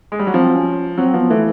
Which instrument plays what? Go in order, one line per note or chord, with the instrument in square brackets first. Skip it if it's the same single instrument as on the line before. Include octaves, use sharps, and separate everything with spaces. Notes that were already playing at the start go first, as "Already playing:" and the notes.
[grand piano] G#3
G3
F#3
[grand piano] F3 [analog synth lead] C4
[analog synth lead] C#4
[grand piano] F#3 [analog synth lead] C4
[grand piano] F3 [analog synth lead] B3
[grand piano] E3 [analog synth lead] A3